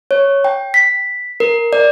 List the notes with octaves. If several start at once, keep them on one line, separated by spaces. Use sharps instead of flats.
C#5
G5
B6
A#4
D5